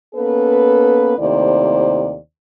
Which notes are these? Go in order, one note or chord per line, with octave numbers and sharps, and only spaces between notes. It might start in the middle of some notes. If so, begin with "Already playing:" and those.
A#3 B3 C#4 A4 B4
D#2 C3 A3 E4 C5 D5